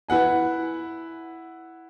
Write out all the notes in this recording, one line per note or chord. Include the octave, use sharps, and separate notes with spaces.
E4 B4 F#5 G#5